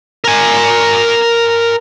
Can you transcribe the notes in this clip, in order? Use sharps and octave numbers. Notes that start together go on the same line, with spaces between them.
A#4 G#5